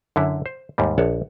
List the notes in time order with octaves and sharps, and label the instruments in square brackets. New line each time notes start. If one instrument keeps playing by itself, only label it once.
[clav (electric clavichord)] F#2 D3 E4
C5
D#2 G#2 G3
A#1 C#5 F#5 A5